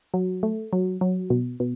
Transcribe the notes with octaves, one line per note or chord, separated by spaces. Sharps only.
F#3
A3
F#3
F#3
B2
B2